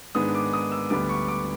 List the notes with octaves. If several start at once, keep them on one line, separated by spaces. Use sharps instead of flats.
G#2 D#3 G#3 B3 D4 D#6
D6
D#6
E6
D2 D3 G3 B3 D4 D6
C#6
D6